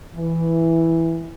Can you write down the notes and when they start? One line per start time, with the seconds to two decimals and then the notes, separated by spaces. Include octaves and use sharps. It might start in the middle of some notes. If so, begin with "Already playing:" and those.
0.16 E3